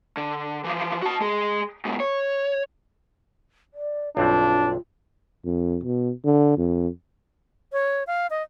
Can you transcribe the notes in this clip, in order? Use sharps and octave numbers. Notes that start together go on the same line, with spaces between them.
D3
E3 F3
F#4 A5
G#3 G#4
G#2 B2
C#5
D5
B1 G2 C4 D4 F4
F2
B2
D3
F2
C#5
F5
D#5